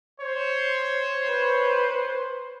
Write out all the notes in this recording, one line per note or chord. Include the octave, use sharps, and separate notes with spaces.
C5 C#5
B4